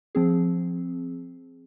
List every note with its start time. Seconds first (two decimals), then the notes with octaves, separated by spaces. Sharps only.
0.15 F3 C4 G#4